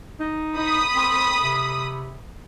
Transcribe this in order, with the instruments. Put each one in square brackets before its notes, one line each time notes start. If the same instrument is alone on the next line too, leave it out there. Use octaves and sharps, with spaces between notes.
[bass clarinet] D#4
[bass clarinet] D#4 [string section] B5 D#6
[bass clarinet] C4
C3